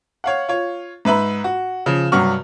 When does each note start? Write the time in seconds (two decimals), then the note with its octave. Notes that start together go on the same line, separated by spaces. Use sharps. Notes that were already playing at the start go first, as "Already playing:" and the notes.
0.24 C#5 F5 F#5
0.49 F4 C#5
1.05 G#2 B4 E5 B5
1.44 F#4
1.86 C#3 F3
2.12 G2 C3 F#3 F#5 C#6 F6